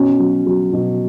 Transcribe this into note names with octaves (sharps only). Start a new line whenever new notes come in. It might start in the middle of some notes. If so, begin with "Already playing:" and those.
Already playing: B2 C#4
F#3
F#3
B2